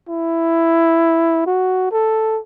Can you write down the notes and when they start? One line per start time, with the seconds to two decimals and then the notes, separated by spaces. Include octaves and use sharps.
0.09 E4
1.46 F#4
1.92 A4